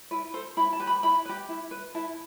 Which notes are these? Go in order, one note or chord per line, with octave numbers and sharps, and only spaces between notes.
E4 B4
A4 C5
E4 B5
A5
G4 B4
B5
E4 B5
G4 B4
E4
B4
E4 A5